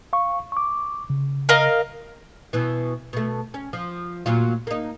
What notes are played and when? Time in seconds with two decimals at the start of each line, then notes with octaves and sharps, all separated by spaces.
0.13 F5 C#6
0.52 C#6 D6
1.10 C#3
1.49 A#4 D#5 F5
2.53 B2 E3
3.13 B2 A3
3.54 C#4
3.73 F3
4.26 A#2 F#3 F4
4.67 A#3 D#4